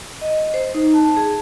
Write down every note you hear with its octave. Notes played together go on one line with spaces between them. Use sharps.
D#5
C5
D#4
A5
G#4